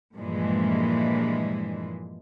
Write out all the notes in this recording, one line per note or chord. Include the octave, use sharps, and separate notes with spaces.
G2 A#2 E3 F3 G#3